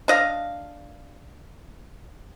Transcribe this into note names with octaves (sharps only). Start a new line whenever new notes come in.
D4 D#5 F5